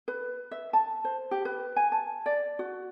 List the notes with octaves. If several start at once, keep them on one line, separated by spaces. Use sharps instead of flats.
B4
E5
A5
C5
G4
B4
G#5
A5
D5
F#4